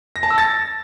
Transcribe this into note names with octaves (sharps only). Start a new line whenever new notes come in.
A#6
A5
E6
A6